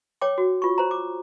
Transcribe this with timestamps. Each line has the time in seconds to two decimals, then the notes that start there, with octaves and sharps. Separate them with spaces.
0.21 C#5 G5 D6
0.38 F#4
0.62 F4 C#6
0.78 C5 A#5
0.91 D6